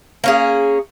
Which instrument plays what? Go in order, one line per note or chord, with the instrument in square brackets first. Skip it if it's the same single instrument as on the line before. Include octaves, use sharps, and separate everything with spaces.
[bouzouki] A#3 C#4 G#4